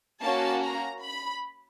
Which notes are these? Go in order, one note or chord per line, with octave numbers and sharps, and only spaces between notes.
A#3 C#4 F#4 A5
A#5
B5